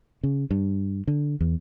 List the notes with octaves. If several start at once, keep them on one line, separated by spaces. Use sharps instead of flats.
C#3
G2
D3
E2